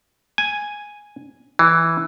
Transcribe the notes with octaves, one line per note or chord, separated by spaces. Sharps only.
G#5
E3